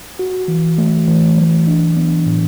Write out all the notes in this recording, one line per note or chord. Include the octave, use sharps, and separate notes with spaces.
F#4
E3
A3
E3
F#3
D4
B3
A2